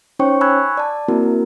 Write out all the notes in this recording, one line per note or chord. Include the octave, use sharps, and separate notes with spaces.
C#4 D#4 C5 C#5 G5 C#6
G#5 B5 C#6 E6 F#6 G#6
D5 A5
A#3 C4 E4 F#4 A#4